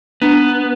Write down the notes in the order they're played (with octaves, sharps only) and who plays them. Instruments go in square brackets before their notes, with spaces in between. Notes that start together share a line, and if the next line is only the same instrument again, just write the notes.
[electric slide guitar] B3 [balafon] D4